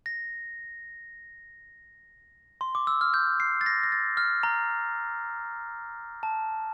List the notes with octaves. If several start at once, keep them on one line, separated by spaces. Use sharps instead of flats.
A#6
C6
D6
E6
F6
G6
C7
A6
A#6
A#6
A6
F6
A#5
A5